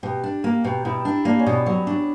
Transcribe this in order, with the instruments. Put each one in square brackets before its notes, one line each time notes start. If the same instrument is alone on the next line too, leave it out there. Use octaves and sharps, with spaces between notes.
[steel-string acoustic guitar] B2 [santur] G4
[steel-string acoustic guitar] D4
[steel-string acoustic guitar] A#3 [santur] A#4
[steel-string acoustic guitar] B2 [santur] G4
[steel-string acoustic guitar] B2 [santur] E4
[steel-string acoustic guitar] D4
[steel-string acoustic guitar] A#3 [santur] D4
[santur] C#4
[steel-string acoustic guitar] B2
[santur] B3
[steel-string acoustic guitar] F#3 [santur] B3
[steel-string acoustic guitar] D4